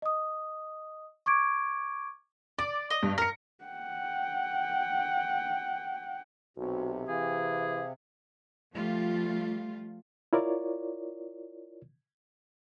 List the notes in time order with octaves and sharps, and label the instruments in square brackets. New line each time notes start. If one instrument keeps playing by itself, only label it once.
[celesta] D#5 D#6
C#6 D6 G#6 D7
[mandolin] D5 [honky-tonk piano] D6
[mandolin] D#5
[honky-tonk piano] G2
[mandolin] A#4 [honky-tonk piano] A#6 C#7
[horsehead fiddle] F#5 G5
[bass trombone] B1 [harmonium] C3 [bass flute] F#4
[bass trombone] E3 [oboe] G#4 [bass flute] F5
[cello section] F3 G3 A3 F4
[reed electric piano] E4 F4 A#4 C#5 D5